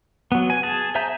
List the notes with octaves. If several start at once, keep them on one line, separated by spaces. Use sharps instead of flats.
F#3 B3
G#5
G#4 A5
C5 E5 G#5 A#5 G6